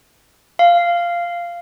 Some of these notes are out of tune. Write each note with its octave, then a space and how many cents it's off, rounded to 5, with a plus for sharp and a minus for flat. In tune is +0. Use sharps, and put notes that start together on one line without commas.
F5 -10